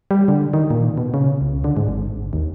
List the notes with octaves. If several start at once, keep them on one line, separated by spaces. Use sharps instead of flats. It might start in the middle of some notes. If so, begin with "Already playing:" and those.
G3
D3
D#3
A#2
B2
C#3
C#2
D3
G#2
G#1
D#2